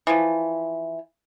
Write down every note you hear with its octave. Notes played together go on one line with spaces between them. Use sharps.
E3 F3